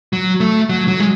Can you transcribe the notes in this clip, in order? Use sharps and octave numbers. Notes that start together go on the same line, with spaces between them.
F#3
A3
F#3
F#3
G#3